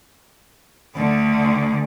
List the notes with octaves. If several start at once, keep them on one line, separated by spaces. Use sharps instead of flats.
D2 D3